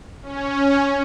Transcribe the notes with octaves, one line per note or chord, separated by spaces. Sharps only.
C#4